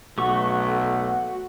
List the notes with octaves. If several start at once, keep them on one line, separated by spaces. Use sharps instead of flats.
B1 A3 F#4 F#5 C#6